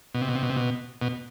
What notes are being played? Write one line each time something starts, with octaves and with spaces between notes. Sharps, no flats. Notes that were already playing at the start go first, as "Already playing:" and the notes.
B2
C3
B2
C3
B2
C3
B2
B2